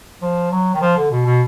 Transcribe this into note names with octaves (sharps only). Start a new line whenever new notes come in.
F3
F#3
D#3
F3
D3
B2
B2